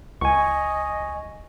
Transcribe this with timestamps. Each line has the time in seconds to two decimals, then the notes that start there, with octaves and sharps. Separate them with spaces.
0.21 C#2 D#5 G#5 C#6